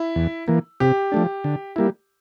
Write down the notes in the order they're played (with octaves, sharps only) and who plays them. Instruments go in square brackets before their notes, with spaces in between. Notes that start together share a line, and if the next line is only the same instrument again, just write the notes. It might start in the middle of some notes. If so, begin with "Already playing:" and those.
Already playing: [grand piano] E4
[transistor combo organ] E2
E3 A#3
[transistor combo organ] C3 [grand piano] G4
[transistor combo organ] F3 A3 D4
D3
G3 A#3 E4